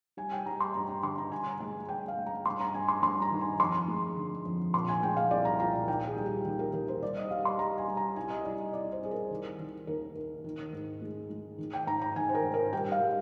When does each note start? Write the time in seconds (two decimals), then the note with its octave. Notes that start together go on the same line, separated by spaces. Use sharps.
0.17 G3 G#5
0.32 G5
0.46 G3 A#5
0.61 C6
0.74 G2 A#5
0.89 A#5
1.03 D3 C6
1.18 A#5
1.32 G2 G#5
1.60 G#3 G#5
1.88 G2 G5
2.08 F5
2.18 G#3
2.26 A#5
2.46 G2 C6
2.61 A#5
2.74 G2 G#5
2.88 C6
3.03 G2 C6
3.22 A#5
3.31 D#3
3.41 G#5
3.60 F2 C6
3.88 G#3
4.17 D3
4.45 F2
4.74 A#2 C6
4.88 G#5
5.02 G#3 G5
5.17 F5
5.31 C2 D5
5.45 A#5
5.60 A#2 A#5
5.88 D#2 G5
6.07 G#4
6.17 G3
6.26 G4
6.45 D#2
6.59 A#4
6.73 D#2 A#4
6.88 C5
7.02 G3 D5
7.17 D#5
7.31 G3 F5
7.45 C6
7.59 G3 A#5
7.78 G#5
7.88 G3
7.97 A#5
8.16 C2 G#5
8.30 D#5
8.45 C2 D5
8.59 D#5
8.73 C2 D5
8.92 C5
9.02 C2 G#4
9.11 A#4
9.31 D#3
9.59 D#3
9.87 D#2 A#4
10.15 D#2
10.44 D#3
10.73 G#2
11.02 G#3
11.30 G#3
11.58 D#3
11.73 G5
11.87 G#2 A#5
12.02 A#5
12.16 D#3 G#5
12.29 C5
12.35 A#4
12.44 G#2
12.54 A#4
12.73 G3 G5
12.92 F5
13.01 G3